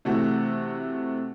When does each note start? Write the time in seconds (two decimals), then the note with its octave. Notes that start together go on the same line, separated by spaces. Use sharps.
0.05 C3 E3 A3 F#4